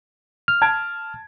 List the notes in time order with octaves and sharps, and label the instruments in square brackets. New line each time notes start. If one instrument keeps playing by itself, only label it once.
[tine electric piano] F6
[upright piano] A5 G#6 D7